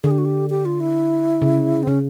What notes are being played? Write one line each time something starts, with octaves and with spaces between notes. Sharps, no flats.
D3 G#4
G4
F#4
G4
G4
F4
E4
C#3
C4
C#3 C#4